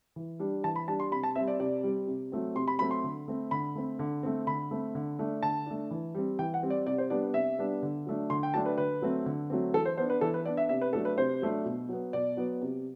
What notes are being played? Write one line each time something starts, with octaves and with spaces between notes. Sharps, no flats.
E3
G3 D4
E3 A5
B5
G3 D4 A5
C6
C3 B5
A5
G3 C4 E5
D5
C3 D5
G3 C4
C3
F#3 A3 C4
C3 C6
B5
F#3 A3 C4 B5
C6
D3
A3 C4
D3 B5
A3 C4
D3
A3 C4
D3 B5
A3 C4
D3
A3 D4
D3 A5
A3 D4
E3
G3 C4
E3 G5
F#5
G3 C4
D5
C3 D5
C5
G3 B3 D4 D5
C3 E5
G3 B3 D4
D3
F#3 A3 D4
D3 C6
G5
F#3 A3 D4 A5
B4
D3 B4
F#3 A3 C4
D3
F#3 A3 C4
E3 A4
C5
B3 D4 C5
B4
E3 A4
B4
B3 D4 D5
E5
C3 E5
B4
F#3 A3 D4 A4
B4
C3 C5
F#3 A3 D4
B2
F#3 B3
B2 D5
F#3 B3
C3